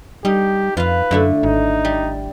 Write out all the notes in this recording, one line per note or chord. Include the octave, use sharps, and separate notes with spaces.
G3 D#4 G4
F2 F4 B4 F5
F#2 D3 A3 E4
G#1 D#4
G3